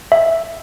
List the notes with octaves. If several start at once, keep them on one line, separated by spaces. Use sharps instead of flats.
E5